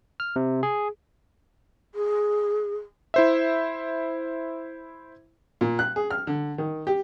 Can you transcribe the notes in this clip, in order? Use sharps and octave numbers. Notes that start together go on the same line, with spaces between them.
F6
C3
G#4
G#4
E4 C5 E5
A#2
F#6
G#4
F6
D3
D#3
G4